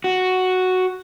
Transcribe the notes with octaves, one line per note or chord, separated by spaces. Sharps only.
F#4